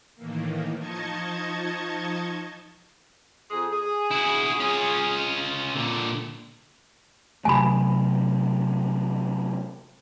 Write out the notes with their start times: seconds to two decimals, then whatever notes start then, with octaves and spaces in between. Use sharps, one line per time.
0.16 A2 D#3 E3 A#3
0.78 F3 D#4 D#5 A5 C#6 G#6
3.51 F2 G#4
3.71 G#4
4.12 E4 F#4
4.60 C#4 F4
5.75 A#2 D3
7.45 C3 F#3 A3 G#5 B5